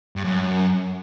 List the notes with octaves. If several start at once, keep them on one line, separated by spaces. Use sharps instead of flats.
G2
F#2